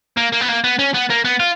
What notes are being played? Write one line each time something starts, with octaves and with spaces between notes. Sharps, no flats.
A#3
A#3
B3
A#3
B3
C#4
B3
A#3
B3
F4